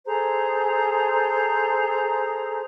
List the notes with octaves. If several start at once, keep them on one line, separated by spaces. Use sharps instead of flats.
G#4 A4 C5 A#5